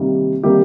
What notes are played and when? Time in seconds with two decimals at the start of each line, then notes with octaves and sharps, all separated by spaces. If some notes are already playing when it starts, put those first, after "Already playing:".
Already playing: C3 D#3 G3 A#3
0.43 C3 D#3 G3 A#3 G4